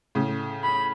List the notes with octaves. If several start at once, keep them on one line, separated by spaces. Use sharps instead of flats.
A2 C#3
B5